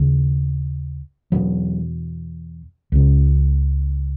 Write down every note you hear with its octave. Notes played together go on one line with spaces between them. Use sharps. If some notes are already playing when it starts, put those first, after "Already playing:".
Already playing: D#2 C#3
E2 B2 F#3
C#2 C#3